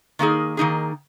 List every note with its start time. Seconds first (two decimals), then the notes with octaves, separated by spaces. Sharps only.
0.19 D#3 A#3 D#4 G#4
0.57 D#3 A#3 D#4 G#4